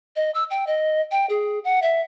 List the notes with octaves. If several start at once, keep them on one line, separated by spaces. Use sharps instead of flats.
D#5
E6
G5
D#5
G5
G#4
F#5
E5